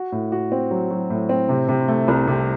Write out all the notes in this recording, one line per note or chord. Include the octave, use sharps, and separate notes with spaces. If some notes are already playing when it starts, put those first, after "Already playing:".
Already playing: F#4
A2
F#4
C4
F#3
F#3
A2
C4
C3
C3
A3
C2
C3